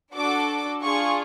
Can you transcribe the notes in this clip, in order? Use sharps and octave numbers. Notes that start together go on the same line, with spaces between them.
D4 F#4 A4 D6
D4 F4 G#4 C#6